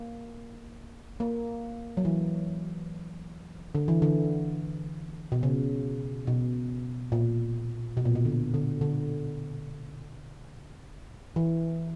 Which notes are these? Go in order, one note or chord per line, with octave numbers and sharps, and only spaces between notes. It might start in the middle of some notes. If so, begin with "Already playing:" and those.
Already playing: A#3
A#3
F#3
E3
D3
E3
D3
B2
C#3
B2
A#2
B2
A#2
B2
D3
D3
D3
E3